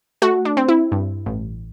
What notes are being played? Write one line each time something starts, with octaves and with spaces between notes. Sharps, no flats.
A3 F#4
D4
C4
E4
G2
A1